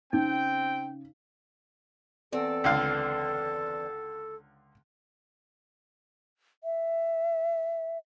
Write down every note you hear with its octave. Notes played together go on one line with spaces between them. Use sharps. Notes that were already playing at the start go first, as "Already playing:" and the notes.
C#3 C4 D#4 G5
E2 C4 A4 D5
C#2 D3 F5
E5